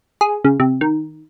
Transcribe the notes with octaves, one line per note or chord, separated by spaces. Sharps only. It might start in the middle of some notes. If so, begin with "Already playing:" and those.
G#4
C#3
C3
D#3